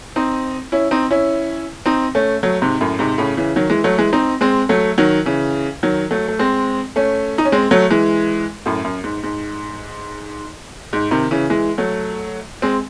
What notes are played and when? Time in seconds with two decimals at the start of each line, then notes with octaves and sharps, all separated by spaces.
0.16 C4 D#4
0.72 C#4 E4
0.91 C4 D#4
1.11 C#4 E4
1.86 C4 D#4
2.15 A3 C#4
2.43 F#3 A3
2.62 G#2 C3
2.81 F#2 A2
2.99 G#2 C3
3.18 A2 C#3
3.37 C#3 E3
3.56 D#3 F#3
3.70 E3 G#3
3.84 F#3 A3
3.98 E3 G#3
4.13 C4 D#4
4.41 G#3 C4
4.69 F#3 A3
4.98 D#3 F#3
5.26 C#3 E3
5.83 D#3 F#3
6.11 F#3 A3
6.28 A3
6.39 G#3 C4
6.96 A3 C#4
7.38 D#4
7.45 C#4
7.52 G#3 C4
7.71 F#3 A3
7.90 E3 G#3
8.66 F#2 A2
8.84 F#2
9.04 G#2
9.23 G#2
10.93 G#2
11.11 C3 D#3
11.31 C#3 E3
11.50 E3 G#3
11.78 F#3 A3
12.62 G#3 C4